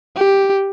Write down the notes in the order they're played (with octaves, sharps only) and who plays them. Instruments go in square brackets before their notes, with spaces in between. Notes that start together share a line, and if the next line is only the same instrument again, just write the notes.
[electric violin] G4